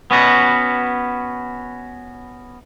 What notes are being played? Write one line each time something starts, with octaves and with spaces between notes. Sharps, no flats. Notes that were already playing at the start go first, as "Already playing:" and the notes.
B3 C#4 F#4 B4